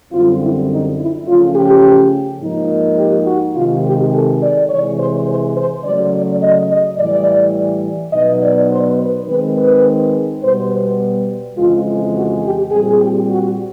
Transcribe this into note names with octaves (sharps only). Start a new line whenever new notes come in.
F#2 D3 G3 C4 F4
E4
D#4
E4
C#3 F3 A3 C#4 F4
G4
G#2 F3 A#3 D#4
G4
F#4
C3 D#3 G#3 F4
G4
A4
D5
C3 E3 G#3 C#5
C5
C5
C5
C#3 F#3 A3 D5
D5
D#5
D#5
A2 E3 G3 D5
B2 F#3 B3 D#4 D#5
D5
C5
B4
D#3 G#3 C4 B4
B4
B2 G3 B3 C5
F2 C#3 E3 G#3 F4
F#4
G4
A#2 G3 C4 G#4
G4
F#4